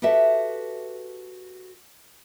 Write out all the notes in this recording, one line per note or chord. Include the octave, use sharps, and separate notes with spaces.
F#4 G4 A4 B4 E5